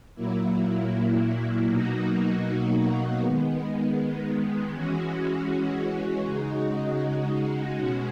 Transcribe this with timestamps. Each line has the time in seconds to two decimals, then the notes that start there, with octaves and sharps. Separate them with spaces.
0.15 A#2 F#3 A#3 E4
1.67 B2 F#3 A#3 D#4 F#4
3.20 D#3 G#3 B3
4.73 E3 G#3 C#4 F#4
6.25 C#3 G#3 D#4 F#4
7.78 B2 G#3 C#4 F#4